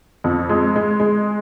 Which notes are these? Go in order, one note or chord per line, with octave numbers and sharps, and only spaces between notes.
F2
G#3
G#3
G#3